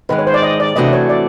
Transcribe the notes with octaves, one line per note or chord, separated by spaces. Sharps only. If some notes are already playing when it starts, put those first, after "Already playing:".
G#2 D#3 G#3 B4
C#5
C5
D5
D#5
D5
C3 E3 A3 D4 F#4 D#5
C#5
D5